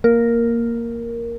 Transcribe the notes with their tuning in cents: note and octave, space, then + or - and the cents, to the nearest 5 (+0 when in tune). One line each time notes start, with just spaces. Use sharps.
A#3 +0 A#4 +0